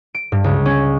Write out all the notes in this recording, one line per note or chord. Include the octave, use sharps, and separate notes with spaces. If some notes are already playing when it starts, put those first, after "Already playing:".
D7
G2
C#2
C#4